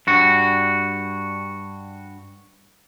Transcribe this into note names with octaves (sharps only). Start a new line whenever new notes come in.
G2 F#4